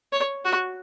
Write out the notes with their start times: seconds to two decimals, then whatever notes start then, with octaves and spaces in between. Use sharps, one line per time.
0.13 C#5
0.45 F#4